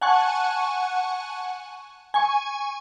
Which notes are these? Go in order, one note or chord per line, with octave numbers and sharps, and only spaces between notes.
F#5 G#5 A5 C#6 F#6
G#5 C#6